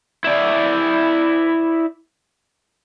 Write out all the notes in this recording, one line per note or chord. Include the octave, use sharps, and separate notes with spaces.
E4 D5